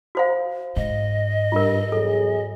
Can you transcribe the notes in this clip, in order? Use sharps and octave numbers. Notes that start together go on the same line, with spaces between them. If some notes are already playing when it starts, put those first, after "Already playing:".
F#4 C5 F5
G#2 D#5
G2 F4 A#4
E2 F#3 G#4 A4